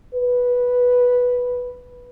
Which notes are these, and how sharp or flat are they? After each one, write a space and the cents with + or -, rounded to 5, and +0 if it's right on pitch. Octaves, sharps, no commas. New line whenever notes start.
B4 -5